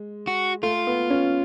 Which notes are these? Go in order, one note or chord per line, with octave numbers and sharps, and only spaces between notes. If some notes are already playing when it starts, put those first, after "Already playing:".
Already playing: G#3
F#4
A3 F4
B3
C#4